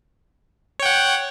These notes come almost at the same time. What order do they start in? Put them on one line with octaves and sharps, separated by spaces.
C#5 G5 F#5